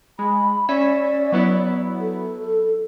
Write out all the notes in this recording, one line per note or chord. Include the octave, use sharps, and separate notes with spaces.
G#3 B5
C#4 D5 E5
F#3 B3 E4
A4